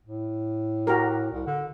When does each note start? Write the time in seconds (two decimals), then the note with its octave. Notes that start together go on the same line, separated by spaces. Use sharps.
0.06 A2
0.87 F#4 G4 A#4
1.32 C2
1.47 D3